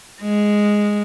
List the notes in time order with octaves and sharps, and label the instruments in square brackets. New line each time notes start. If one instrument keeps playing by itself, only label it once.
[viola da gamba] G#3